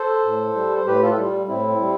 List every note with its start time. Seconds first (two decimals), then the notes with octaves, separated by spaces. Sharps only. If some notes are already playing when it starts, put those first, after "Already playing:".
Already playing: A4 C5
0.25 A2
0.56 G3
0.77 C5
0.87 A2 G4 B4
1.02 F4 A4
1.18 G3
1.48 A2 C4 E4
1.80 G3